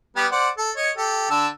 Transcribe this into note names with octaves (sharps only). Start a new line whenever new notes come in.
G3 B3 G4
C5 D5 F#5
A4
C#5 D#5
G4 A4
D3 A5 E6